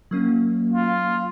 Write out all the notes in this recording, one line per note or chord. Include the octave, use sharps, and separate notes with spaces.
F#3 A#3 C#4
F4